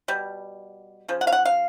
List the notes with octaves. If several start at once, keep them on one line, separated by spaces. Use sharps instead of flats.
B2 G3
C#3 F3
F#5
F5
F#5
F5